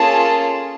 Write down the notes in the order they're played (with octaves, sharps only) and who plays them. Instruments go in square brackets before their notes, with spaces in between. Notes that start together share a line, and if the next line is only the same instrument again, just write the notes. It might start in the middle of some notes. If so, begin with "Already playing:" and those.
Already playing: [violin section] A#3 C#4 F4 G#4 A4 A5